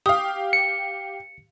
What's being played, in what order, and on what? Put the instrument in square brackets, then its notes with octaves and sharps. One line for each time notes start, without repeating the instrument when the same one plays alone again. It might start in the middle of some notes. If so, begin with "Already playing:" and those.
[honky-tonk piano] G4 F5 [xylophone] D#6
[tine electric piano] C#7